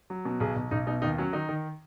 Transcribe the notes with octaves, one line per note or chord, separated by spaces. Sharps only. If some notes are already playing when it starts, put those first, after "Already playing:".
F#3
B2
B1 G#4
B1
B1 D#4
B2 D#4
D#2 D#4
F#3 C#4
D#3 D#4
D#3